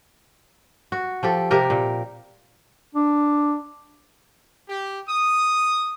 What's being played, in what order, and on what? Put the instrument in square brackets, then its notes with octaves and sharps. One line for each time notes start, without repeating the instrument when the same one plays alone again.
[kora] F#4
F3 G4 A4
C3 G4 A#4
A#2
[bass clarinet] D4
[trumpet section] G4
D#6